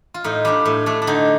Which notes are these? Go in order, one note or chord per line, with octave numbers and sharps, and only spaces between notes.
F4
A2 D#4
G3 D4
A2
A3 D4
D4
D3 D#4